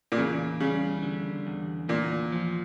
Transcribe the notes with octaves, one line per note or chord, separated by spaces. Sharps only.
A#2
E2 C#3
C#3 G3
D3
E2
E2 A#2
F3